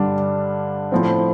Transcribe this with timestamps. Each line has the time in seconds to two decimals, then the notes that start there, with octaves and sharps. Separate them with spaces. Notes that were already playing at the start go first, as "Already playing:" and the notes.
Already playing: G2 D3 G3 D4
0.92 A2 F3 C4